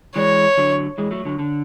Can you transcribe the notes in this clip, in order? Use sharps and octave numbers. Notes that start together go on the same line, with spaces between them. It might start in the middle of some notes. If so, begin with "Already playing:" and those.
E3 G#3 C#5
D3 F#3
E3 G#3
F#3 A3
D3 F#3
D3